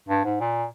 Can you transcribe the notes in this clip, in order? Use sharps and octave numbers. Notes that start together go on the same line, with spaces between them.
G2
G#2
A#2